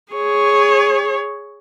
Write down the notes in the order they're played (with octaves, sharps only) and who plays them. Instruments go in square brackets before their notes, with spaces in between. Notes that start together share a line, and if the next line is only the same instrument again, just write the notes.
[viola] G#4 C#5